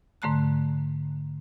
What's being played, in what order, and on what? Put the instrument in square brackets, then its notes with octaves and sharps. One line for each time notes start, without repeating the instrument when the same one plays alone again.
[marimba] G#2 D3 A3 A#5 F#6